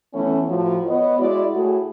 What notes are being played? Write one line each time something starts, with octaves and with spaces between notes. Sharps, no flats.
E3 A3 B3 C#4
A2 F3 F#3
B3 C#5 D#5
G#3 E4 F#4 D5
A2 F#4 G#4